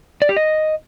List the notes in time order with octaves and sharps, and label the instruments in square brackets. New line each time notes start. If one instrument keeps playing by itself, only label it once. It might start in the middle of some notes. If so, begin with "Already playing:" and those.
[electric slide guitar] D5
G4
D#5